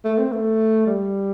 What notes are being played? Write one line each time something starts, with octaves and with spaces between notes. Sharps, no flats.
A3
C4
A3
G3